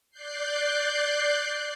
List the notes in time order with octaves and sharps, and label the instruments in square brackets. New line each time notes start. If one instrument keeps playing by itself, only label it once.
[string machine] D5 F#6 G6 C7